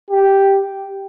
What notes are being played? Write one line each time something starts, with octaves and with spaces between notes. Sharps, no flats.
G4